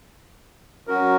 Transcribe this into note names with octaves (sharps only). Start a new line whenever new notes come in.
F#3 C#4 F#4 A#4